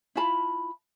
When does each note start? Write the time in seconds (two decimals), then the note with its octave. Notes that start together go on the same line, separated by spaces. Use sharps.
0.15 E4 F4 A5 B5